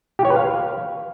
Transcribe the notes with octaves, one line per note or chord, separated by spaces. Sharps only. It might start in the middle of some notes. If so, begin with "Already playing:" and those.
G4
C#5
B4
F5